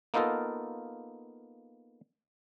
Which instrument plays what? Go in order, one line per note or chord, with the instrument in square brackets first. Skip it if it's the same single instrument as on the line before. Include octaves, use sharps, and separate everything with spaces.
[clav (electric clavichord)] A#3 B3 D#4 F4 A4 A#4